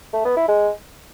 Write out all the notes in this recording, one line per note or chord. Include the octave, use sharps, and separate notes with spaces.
A3
B3
E4
G#3